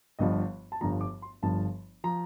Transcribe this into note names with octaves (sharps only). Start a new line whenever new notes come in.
G1 G2 F3 D#5
A5
G1 G2 F3 A#5
D6
C6
G1 G2 F3 A5
F3 A#5